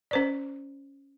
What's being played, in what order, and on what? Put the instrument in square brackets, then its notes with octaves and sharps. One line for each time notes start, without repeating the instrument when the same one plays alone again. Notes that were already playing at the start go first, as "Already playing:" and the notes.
[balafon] C#4 C5 D5